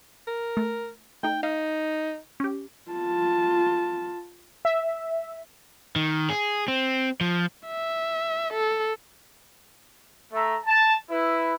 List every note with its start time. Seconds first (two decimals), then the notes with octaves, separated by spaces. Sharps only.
0.27 A#4
0.57 A3
1.23 A3 D#4 G5
1.43 D#4 F5
2.40 C#4 G4
2.91 F4 A5
4.65 E5
5.96 D#3
6.30 G#4
6.68 C4
7.21 F3
7.67 E5
8.53 A4
10.33 A3 A4 E5 A#5
10.66 A5
11.10 E4 B4